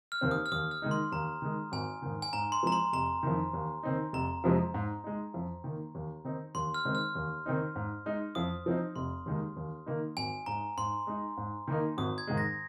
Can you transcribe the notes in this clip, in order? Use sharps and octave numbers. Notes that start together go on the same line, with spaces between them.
F6
D#2 D#3 C4
D#6
F6
D#2 D#6
F6
D#3 G#3 D#4
C6
D#2 A#5
D#3 G#3
G#1 G#5
G#2 D#3
G#5
G#2 A#5
C6
F3 G#3 C4 A#5
C6
F1 A#5
F2 D#3
D#2
D#3 C4 D#4
F1 A#5
F2 C3 F3 G#3
G#2
G#3 D#4
F2
D#3 A#3
D#2
D#3 C4 D#4
D#2 C6
F6
D#3 G#3 C4
F6
D#2
D#3 C4 D#4
G#2
G#3 D#4
F2 D#6
F3 C4 D#4
F1 C6
D#2 D#3 G#3
D#2
D#3 A#3 D#4
G#1 G#5
G#2 G#3 A#5
G#2 C6
G#3 D#4
G#2
D#3 A#3 D#4
G#1 D#6
G#6
G#2 D#3 G#3
A#6